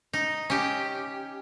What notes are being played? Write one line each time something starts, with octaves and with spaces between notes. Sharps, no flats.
D#4
C#4 G4